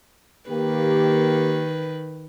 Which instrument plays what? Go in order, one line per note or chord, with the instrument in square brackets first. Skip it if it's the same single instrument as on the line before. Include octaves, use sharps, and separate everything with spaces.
[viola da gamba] D#3 B4 [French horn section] A#3 G4